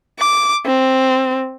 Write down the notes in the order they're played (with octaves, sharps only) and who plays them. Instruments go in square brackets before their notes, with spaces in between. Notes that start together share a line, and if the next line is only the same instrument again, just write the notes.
[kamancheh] D6
C4